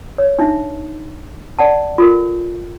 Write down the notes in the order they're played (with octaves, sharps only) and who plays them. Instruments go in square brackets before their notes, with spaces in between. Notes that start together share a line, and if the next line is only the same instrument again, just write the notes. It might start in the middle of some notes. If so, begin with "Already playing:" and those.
[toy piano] C#5
D4 D#4 E5
D5 F#5 A5
F4 A4 A#4